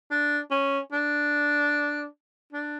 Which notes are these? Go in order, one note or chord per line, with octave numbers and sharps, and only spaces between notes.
D4
C#4
D4
D4